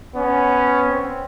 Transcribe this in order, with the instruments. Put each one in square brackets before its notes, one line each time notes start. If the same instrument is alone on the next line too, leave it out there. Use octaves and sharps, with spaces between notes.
[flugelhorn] B3 [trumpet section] C#4
[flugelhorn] C4